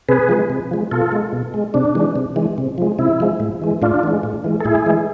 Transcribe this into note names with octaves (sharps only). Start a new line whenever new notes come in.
C3 G#4 B4
F3 G#3
C3
F3 G#3
B2 F4 A4
G#3
B2
G#3
C3 D4
E3 G#3
C3
E3 G#3
C3
F3 G#3
C3 E4
F3 G#3
A2
E3 G#3
A2 D4 F4
E3 G#3
A2
E3 G#3
A4
A2 E4 G#4
E3 G#3